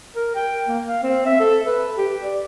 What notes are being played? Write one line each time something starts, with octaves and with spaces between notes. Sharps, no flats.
A#4
G5
A#3
F5
C4
E5
A4
B4
G4
D5